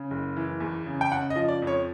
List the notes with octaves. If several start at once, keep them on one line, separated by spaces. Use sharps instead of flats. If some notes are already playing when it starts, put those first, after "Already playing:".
Already playing: C#3
F#1
E3
E2
C#3
G5
C#3 F#5
D#5
F3
D5
F2
C#5